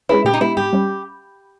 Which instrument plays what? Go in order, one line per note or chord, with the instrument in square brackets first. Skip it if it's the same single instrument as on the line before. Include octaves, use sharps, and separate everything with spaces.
[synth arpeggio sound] G#3 C#4 G#4 B4 [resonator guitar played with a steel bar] E4
[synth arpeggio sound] A#2 [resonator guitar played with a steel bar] G4
[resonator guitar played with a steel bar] D#4
[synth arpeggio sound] G#3 B3 [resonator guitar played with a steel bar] E4
[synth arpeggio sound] G#2 [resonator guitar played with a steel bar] G4
[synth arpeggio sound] G3 C#4